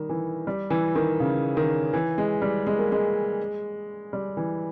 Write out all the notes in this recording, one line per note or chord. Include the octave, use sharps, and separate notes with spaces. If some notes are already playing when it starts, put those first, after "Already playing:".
Already playing: D#3 G3
E3
G3
E3
D#3
C#3
D#3
E3
G#3
G3
G#3
A#3
G#3
G3
E3